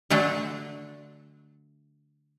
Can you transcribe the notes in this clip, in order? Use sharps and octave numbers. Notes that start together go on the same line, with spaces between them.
D3 F#3 A3 D4 A4